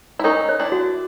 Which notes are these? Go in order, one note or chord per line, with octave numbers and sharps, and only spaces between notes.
E4
C#4 D#4 A#4
C#5
D4 E4
F#4